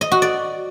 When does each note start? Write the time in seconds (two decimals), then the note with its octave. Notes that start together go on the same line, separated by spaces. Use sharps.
0.01 D#5
0.12 F#4
0.22 D5